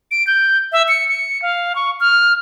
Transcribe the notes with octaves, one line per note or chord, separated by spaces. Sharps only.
D7
G6
E5
C#7
C#7
F5
C#6
F6